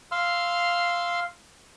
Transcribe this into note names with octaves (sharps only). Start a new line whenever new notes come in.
F5 C6 E6 F6